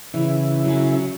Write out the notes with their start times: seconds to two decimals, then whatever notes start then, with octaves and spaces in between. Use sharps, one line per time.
0.14 C#3 E3 E4
0.65 F#3 C#4